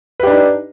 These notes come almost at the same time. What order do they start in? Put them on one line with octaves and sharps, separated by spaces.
B4 G4 D4 D#4